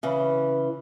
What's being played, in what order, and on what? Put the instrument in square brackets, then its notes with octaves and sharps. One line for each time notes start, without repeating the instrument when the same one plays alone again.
[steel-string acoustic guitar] C#3 E3